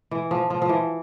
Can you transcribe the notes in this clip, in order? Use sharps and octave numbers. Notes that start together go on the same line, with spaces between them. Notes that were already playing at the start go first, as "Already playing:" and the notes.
E3
F3
F3
F3
E3